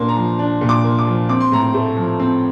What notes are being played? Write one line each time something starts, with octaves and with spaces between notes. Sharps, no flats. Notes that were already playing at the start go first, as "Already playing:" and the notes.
Already playing: A#2 A#3 D4 C6
A#5
F3
D4
A#2
D6
A#3
D6
F3
C4 D6
C6
A2 A#5
C6
A3
F3
C4